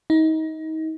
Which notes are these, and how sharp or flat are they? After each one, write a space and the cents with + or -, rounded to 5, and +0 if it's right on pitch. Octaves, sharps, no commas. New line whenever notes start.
D#4 +30